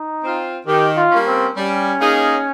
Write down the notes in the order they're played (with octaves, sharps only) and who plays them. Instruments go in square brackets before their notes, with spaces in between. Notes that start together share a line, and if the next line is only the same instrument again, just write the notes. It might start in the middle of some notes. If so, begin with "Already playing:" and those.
Already playing: [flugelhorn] D#4
[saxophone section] C4 F4
[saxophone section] D#3 [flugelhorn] G4
[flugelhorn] F4
[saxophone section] G3 A#3 C#4
[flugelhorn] C4
[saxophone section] G3 [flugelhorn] C#4
[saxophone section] A#3 D#4 G#4